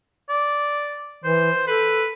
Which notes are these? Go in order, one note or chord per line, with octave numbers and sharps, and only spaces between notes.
D5
E3 C5
A4 B4